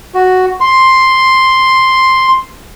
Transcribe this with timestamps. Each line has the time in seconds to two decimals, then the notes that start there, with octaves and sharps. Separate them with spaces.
0.14 F#4
0.60 C6